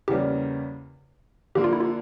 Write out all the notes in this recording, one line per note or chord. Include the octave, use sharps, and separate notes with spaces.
E2 C#3 G3 A#3 C#4 G4
D3 F3 A#3 G4
F4
E4
F4